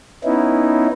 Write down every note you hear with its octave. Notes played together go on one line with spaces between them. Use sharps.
B3 C#4 D#4 E4